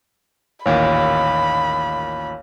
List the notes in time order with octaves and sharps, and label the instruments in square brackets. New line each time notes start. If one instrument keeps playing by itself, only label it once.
[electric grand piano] A1 D#2 A#2 [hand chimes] C#5 F5 [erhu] B5